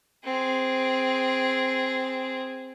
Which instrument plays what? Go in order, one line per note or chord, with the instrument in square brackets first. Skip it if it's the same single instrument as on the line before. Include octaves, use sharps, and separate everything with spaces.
[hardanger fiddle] C4 G#4